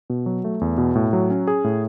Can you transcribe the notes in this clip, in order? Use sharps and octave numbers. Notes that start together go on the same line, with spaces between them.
B2
F#3
A3
E2
B2
A2
F#3
C#4
G#4
A2